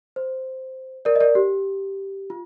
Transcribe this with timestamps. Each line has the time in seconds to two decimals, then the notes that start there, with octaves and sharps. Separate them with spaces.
0.16 C5
1.05 A#4 D5
1.16 D#5
1.21 A#4 D5
1.35 G4
2.30 F4